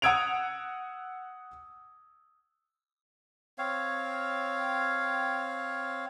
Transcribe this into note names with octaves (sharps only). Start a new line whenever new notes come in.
F#5 D#6 E6 G#6 D7 F7
C4 C#5 F5